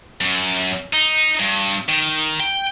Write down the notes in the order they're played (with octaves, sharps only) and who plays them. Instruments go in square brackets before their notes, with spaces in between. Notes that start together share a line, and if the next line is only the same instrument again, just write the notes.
[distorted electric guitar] F#2
D#4
G2
D#3
G5